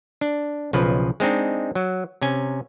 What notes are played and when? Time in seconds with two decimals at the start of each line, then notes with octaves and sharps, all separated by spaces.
0.21 D4
0.73 B1 C#3 F3 B4
1.20 G#3 C4 D4 D#4
1.75 F#3
2.22 C3 C#4 G#5